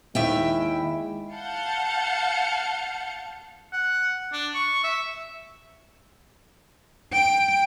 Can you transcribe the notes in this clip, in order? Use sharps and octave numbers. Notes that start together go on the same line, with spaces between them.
D#2 G#3 E4 E5 G5
F5 F#5 A5 G6 C#7
F#5
D4
C#6
E5
G5